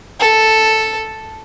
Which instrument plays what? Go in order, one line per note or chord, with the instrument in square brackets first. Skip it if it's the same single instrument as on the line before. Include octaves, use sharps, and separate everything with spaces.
[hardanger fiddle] A4